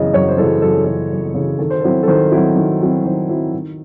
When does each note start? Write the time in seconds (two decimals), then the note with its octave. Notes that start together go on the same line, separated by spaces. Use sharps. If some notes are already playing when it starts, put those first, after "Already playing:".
Already playing: F#2 C#3 E3 D#5
0.13 F#2 C#5
0.28 C5
0.38 C#3 E3 A4
0.62 F#2 A4
0.73 G#4
0.85 C#3 E3 A4
1.11 F#2
1.34 C#3 E3
1.59 D#3 A4
1.70 C5
1.81 A4
1.84 F#3 C4 E4
2.03 A4
2.08 D#3 C5
2.31 F#3 C4 E4
2.56 D#3
2.81 F#3 C4 E4
3.04 D#3 C5
3.29 F#3 C4 E4
3.53 D#3